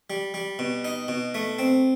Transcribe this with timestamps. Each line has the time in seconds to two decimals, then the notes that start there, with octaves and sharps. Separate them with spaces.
0.10 G3
0.34 G3
0.59 B2
0.85 D#4
1.08 B2
1.35 A3
1.59 C4